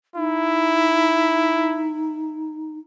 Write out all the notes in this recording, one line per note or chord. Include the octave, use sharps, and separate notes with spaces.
D#4 E4